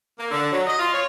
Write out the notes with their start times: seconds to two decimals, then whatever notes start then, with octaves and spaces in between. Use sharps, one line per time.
0.18 A#3
0.31 D3
0.52 F#3
0.67 D#5
0.79 F4
0.94 C#5